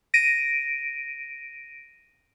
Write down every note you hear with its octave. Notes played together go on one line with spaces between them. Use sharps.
A#6 D7 D#7